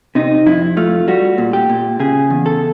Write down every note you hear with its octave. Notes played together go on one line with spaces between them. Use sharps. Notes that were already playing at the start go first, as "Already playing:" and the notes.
C3 D#4
F2 E4
A3 F4
G3 F#4
A#2
G4
A#2
C#3 G#4
E2
A4